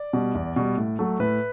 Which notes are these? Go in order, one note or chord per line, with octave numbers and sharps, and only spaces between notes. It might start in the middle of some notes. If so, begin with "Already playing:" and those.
Already playing: D5
B2 G3
E2
B2 G3
A2
F#3 A3
A2 B4